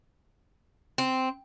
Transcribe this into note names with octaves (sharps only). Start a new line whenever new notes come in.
C4